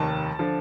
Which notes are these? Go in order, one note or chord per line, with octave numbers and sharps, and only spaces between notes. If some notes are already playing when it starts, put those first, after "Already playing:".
Already playing: F1 D#2 D#3 A5
D3 F3